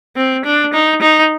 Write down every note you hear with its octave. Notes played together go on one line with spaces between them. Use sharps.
C4
D4
D#4
D#4